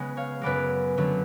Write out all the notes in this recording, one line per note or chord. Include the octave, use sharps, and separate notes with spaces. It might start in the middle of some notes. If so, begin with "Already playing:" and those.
Already playing: C#3 G#3 B3
C#5 F5
F#2 C#3 G#3 B3 B4 D5
F#2 D3 F#3 B3